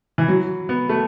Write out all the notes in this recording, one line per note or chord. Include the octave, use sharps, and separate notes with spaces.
E3
F#3
B3
A3